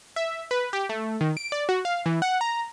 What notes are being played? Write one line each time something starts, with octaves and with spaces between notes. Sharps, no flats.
E5
B4
G4
A3
D#3
D7
D5
F#4
F5
E3
F#5
A#5